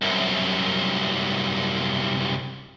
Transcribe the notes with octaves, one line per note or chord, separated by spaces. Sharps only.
C2 F#2